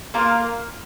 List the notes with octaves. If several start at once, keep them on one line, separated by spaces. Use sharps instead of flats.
A#3 F4 A#4